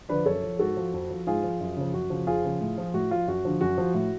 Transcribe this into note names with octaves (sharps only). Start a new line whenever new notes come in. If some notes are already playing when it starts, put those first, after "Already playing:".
D3 F3 B4 D5
F#2 A4 C#5
F3
G#2 F#4 A4
F3
F2
F3
G#2 F4 G#4
F3
F#2
C#3 F3
F#2 F#4
C#3 F3
F2 F4 G#4
C#3 F3
A2
F3
A2 F#4
F3 F4
F#2 F#4
D3 F3
F#2 F#4
F3
A2